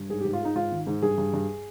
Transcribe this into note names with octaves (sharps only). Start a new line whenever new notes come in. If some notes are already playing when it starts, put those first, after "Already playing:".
Already playing: G2
G#2 G#4
G#2 G4
F4
G#3 D#4
G#2 F4
D#3
G#2
G2 G#4
G2
G2